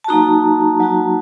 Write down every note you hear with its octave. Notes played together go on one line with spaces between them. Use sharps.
A5
F#3 A#3 D#4 F#4 A#5
F#3 A#3 D#4 F#4